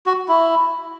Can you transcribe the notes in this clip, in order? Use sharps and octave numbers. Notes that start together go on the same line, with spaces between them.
F#4
E4